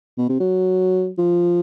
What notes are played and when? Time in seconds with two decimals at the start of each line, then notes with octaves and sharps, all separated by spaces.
0.18 B2
0.29 C3
0.40 F#3
1.18 F3